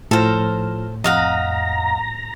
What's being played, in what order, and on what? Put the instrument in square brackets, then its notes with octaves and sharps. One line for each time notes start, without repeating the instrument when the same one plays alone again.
[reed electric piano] A2 [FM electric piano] F3 F6 A#6 [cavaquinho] A4 C5
[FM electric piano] F2 B6 [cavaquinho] D#5 F5 F#5 [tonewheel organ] A#5